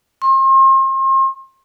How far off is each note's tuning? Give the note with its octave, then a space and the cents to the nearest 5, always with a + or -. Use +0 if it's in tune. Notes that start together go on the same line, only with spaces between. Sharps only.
C6 +40